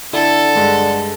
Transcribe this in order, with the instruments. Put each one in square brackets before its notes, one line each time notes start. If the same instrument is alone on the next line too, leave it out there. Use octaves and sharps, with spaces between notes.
[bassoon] D3 [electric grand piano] E4 [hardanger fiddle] A4
[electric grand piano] G2 G#3